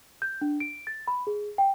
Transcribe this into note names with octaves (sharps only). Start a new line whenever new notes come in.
G6
D4
D7
A6
B5
G#4
G5